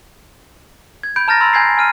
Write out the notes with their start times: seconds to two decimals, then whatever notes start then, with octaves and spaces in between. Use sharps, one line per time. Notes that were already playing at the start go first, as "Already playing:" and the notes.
1.03 G#6
1.16 B5 G6 D7
1.28 A5 A#5 F6 G6 A6 A#6
1.41 B5 C6 E6 G6
1.53 G#5 G6 G#6 A#6 C7
1.78 G#5 F6 D#7